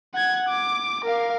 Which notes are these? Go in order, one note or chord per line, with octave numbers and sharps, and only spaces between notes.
F#5 G#6
D6
A#4 F5